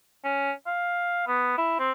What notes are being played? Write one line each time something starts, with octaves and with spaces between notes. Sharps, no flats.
C#4
F5
B3
E4
C4